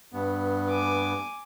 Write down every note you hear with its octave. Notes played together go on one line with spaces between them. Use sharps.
G2 B3
G#5 D6